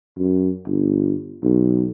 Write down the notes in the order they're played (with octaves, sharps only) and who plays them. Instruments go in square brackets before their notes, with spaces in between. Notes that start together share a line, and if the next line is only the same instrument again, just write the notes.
[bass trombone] F#2
G1
B1